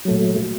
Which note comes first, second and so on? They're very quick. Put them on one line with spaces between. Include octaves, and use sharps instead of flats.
F#3 A3 A#2